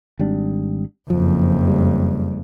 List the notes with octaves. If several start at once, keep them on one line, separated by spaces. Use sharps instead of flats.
G#1 G3 D4
F#1 F2 F3
G3